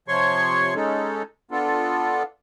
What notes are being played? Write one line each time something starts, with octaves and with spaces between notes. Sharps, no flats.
C3 F3 C#5 C6 C#6
G#3 C#4 D#4 A4
B3 D4 F4 A4